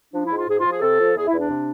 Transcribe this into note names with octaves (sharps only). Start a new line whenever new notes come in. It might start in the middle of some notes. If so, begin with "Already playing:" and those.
F3 D4
E4
G#2
F4
G#2 G#4
F3 F4
G#4
C3 A4
F3
E2 G#4
E4
E2 D4
C3